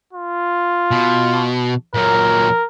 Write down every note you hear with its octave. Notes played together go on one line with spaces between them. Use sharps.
F4
B2
A#2 F#3 A#4